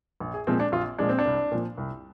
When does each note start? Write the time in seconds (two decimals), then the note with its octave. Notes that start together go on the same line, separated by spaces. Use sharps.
0.20 A#1
0.34 G#4
0.47 A#2 F3 G#3 C4
0.60 D4
0.72 A#1 F4
0.98 A#2 F3 G#3 D4
1.09 C4
1.19 D4
1.25 C2
1.52 A#2 F3
1.78 C2